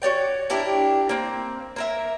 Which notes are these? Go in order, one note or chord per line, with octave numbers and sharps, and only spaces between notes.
F#4 C#5 D5 G5
D4 E4 G4 A#4
A#3 C4
A#3 A#4 E5